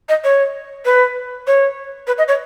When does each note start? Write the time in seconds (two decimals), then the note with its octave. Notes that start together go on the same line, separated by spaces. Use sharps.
0.09 D#5
0.24 C#5
0.85 B4
1.47 C#5
2.07 B4
2.18 D#5
2.28 C#5